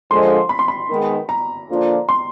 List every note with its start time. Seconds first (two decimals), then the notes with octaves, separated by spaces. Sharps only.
0.10 D3 F3 G#3 C6
0.49 B5
0.59 C6
0.68 B5
0.89 D#3 G#3 B3
1.29 A#5
1.69 D3 F3 A#3 D4 F4
2.09 C6